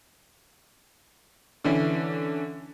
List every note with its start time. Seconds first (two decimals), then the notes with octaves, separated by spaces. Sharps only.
1.64 D3 E3 C#4